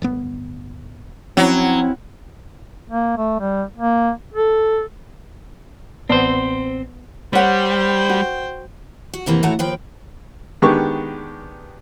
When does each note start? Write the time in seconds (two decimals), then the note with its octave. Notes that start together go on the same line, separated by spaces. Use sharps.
0.02 D1 G1 B3
1.37 F3 F#3 C4 C#4 E4
2.90 A#3
3.18 A3
3.39 G3
3.76 A#3
4.34 A4
6.09 A1 B3 C4 C5 D5 A5
7.33 G3 C5 C#5 F#5 G5
8.09 F#4
9.13 F#4
9.26 F2 C3 E3 A#3
9.43 A2 E3 A3 F#4 F#5 A#5
9.59 D#2 F3 B4 G5
10.62 D#3 G#3 B3 D4 G4 C#6